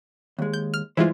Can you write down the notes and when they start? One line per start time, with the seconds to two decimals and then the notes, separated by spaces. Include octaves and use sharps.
0.39 D#2 G#3
0.54 G6
0.74 F6
0.97 G2 E3 G#3 E4 F4 C5